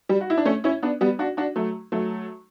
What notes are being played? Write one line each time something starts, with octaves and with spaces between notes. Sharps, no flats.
G3
F#4
E4
D4
A3 C#4
C#4 E4
B3 D4
G3 B3
D4 F#4
D4 F#4
F#3 A3
F#3 A3